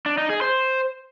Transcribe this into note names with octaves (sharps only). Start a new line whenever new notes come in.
D4
D#4
G#4
C5